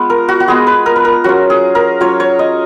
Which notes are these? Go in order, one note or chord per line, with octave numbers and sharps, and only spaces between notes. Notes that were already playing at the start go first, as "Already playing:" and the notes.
Already playing: G#3 B3 F4
A#4
F#4
F#4
G#3 B3 F4 G#4
B4
A#4
B4
A#4
F#3 C#4 F4 F#4
G#4
A#4
F#3 C#4 F4 C#5
C#5
D#5